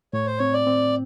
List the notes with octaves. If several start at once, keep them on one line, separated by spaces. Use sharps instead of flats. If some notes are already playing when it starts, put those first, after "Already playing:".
A2 C#5
C5
C4 C#5
D5
C4